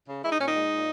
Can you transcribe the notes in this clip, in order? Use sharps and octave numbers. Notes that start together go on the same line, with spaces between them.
C#3
G#3 E4
D#4
A#2 C#4
D#4
G#3
A#2